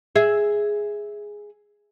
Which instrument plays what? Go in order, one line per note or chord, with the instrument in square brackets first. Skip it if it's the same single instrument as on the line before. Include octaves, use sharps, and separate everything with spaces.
[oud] G#4 E5